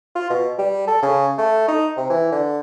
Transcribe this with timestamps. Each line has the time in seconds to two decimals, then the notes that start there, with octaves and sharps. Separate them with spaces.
0.15 F4
0.30 B2
0.59 G3
0.87 A4
1.03 C#3
1.38 A3
1.68 D#4
1.97 C3
2.10 E3
2.32 D3